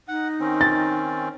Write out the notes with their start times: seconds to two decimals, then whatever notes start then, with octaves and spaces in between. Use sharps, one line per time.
0.08 D#4 F#5
0.40 D#3 C4 C#4
0.61 A6